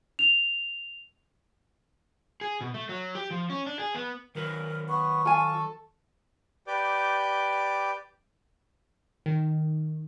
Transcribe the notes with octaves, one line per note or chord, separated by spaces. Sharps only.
F7
G#4
B2
A3
F#3
G4
F3
C#4
D4
G#4
B3
D#3 F#3 A#4 B4
B3 C#6
F4 A4 G#5
G4 B4 D5 D6 G6
D#3